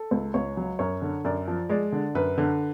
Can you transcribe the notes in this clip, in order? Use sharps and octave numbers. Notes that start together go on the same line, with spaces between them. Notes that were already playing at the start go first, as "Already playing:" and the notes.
Already playing: A4
C#2
C#2 C#5
F#3
F#2 C#5
D3
F#2 D5
F3
G#3 D5
D3
F#2 B4
D3